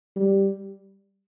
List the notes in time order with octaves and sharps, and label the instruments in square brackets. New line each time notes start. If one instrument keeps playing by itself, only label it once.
[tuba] G3